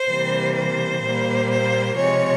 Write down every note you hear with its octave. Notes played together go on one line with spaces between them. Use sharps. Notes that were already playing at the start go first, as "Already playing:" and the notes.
Already playing: C5
C3 E3 G3 A#3
C5
A#2 G3 A#3
C5
C3 F3 G#3 C#5